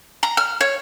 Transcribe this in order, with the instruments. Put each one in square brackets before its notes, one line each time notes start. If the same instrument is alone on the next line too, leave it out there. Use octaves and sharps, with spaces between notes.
[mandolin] A#5
F6
C#5